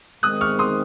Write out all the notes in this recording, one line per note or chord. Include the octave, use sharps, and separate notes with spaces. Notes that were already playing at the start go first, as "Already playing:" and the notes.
G#2 D#3 G#3 C4 D#6 F#6
C#6 F6
C6 D#6